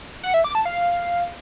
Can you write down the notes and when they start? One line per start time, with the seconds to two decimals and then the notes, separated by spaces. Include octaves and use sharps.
0.23 F#5
0.34 E5
0.44 D6
0.55 A5
0.65 F5